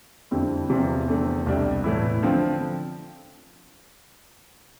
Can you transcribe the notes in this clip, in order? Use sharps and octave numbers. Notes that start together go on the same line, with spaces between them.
F2 D3 G3 C4 E4
E2 C3 F3 B3 F4
E2 D3 A3 C4
C2 B2 G3 D4 G4
A2 E3 A3 E4
D3 F3 C4